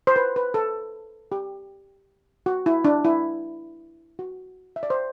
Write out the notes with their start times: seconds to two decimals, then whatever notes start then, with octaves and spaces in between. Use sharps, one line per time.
0.07 C5
0.16 B4
0.36 B4
0.54 A4
1.32 G4
2.46 F#4
2.66 E4
2.85 D4
3.04 E4
4.19 F#4
4.76 E5
4.83 D5
4.90 C5